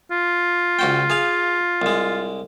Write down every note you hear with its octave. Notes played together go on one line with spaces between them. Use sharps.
F4
C#2 F#4 G5
G#4 F5 G#5
C2 G#3